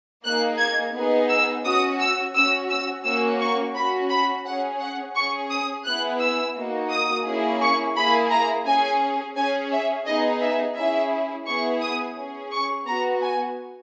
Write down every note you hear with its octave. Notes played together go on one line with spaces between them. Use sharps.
A#3 D#4 G#4 F#6
G#6
B3 D#4 G#4
E6
C#4 F#4 D#6
E6
C#4 F#4 E6
E6
A#3 C#4 F#4 E6
C#6
C#4 F#4 B5
B5
C#4 G#4 F#5
F#5
C#4 G#4 C#6
D#6
B3 E4 G#4 F#6
E6
A#3 D#4 F#4
D#6
A#3 C#4 E4 G#4
C#6
A#3 E4 G#4 B5
A#5
C#4 G#4 G#5
C#4 G#4 G#5
E5
B3 D#4 G#4 D#5
E5
C#4 E4 G#4 E5
B3 E4 G#4 C#6
D#6
C#4 G#4
C#6
B3 F#4 A#5
G#5